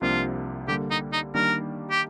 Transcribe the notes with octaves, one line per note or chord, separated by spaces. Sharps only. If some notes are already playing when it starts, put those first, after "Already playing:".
C2 C3 F3 A#3 D4 F4
D3 G3 A#3 G4
D#4
D#4
D#3 G3 A#3 D4 A#4
G4